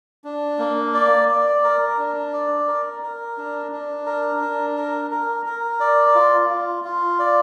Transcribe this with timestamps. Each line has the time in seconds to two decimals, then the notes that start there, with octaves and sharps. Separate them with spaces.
0.24 D4
0.59 A#3
0.94 D5
1.29 D5
1.64 A#4
1.98 D4
2.33 D5
2.68 A#4
3.03 A#4
3.38 D4
3.72 D4
4.06 A#4
4.41 D4
4.76 A#4
5.11 A#4
5.46 A#4
5.80 D5
6.15 F4
6.50 F4
6.84 F4
7.19 D5